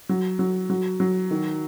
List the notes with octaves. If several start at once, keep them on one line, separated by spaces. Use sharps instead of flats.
F#3
F#3
F#3
F#3
D#3